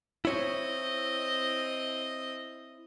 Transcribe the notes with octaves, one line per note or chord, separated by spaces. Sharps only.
C4 E4 C#5 D#5